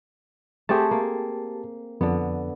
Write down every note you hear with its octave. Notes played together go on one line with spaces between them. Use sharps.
A3 C4 G4 G#4 A5
A#3
F2 D3 B3